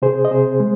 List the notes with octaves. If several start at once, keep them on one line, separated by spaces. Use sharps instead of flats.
C3 G#4 C5
D#5
C3 G#4 C5
G#3